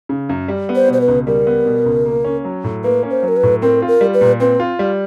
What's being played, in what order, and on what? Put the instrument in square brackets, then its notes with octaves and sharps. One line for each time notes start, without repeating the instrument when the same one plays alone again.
[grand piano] C#3
F#2
G3
B3
[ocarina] C5
[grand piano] B2 [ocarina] C5
[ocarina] B4
[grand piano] C#2
[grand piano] G3 [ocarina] A#4
[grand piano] B3
B2
C#2
A#3
C#4
F#3
A2
[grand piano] A#3 [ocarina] B4
[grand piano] C#4
[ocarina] C5
[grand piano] F#3
[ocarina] A#4
B4
[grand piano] A2
[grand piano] C4 [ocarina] A#4
[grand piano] F4
[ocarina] A#4
[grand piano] G3
[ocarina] B4
[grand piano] A#2
[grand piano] C4 [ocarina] B4
[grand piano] F4
G3